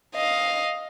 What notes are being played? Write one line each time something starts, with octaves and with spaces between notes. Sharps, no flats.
D#5 F5